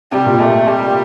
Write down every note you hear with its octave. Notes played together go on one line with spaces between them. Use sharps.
C3 G3
A#2
A3
G3